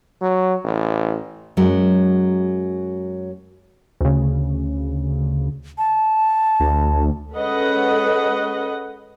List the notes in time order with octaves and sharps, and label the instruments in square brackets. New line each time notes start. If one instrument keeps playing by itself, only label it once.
[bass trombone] F#3
A1
[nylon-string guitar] F#2 F#3 G#3
[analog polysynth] D2 C#3
[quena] A5
[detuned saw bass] D2
[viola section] G#3 C#4 A4 B4 D#5 F#5